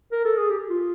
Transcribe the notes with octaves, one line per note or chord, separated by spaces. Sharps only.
A#4
A4
G#4
G4
F4